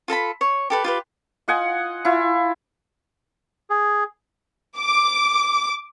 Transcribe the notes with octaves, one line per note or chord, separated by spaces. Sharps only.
F4 A4 A#5 B5
C#5
G4 A4 B4
F4 G4 B4
F4 D#5 F#5 G#5
E4 F4
G#4
D6